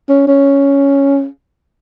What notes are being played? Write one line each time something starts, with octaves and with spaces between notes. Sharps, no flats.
C#4
C#4